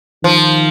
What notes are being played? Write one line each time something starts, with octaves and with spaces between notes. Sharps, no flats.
D#3 F3